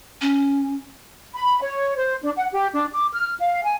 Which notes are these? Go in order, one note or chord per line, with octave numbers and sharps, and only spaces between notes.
C#4
B5
C#5
C5
D4
F#5
G4
D4
D6
F6
F5
G#5